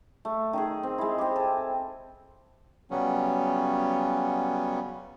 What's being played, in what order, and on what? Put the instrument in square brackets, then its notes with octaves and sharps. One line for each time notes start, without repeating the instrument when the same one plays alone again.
[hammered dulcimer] A3
D#3 D#4 G#4
C4
G#3 E4
C4 G4
A4 G#5
[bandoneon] C#3 F#3 G3 B3 C#4